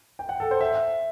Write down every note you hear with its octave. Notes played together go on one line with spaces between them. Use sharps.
G5
F#5
A4
C5
E5